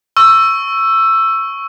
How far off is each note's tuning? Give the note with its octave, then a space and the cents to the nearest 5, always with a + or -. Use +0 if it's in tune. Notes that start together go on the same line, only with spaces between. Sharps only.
C#6 +0 E6 +10